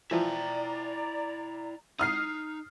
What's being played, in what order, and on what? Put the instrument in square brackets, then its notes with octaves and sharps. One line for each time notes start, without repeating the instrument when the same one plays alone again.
[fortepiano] E3 F3 [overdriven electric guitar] E4 G5 [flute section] D5 A#5
[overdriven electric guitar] D#4 [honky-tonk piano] D#6 F6 C7